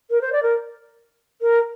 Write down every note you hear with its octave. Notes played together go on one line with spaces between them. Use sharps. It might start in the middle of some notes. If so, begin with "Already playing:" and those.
A#4
C5
D5
A#4
A#4